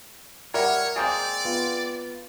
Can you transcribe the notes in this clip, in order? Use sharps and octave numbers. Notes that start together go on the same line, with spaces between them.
G3 A#4 C#5 E5 F#5
G#3 A#3 C4 D5 D#6 G6
B3 F4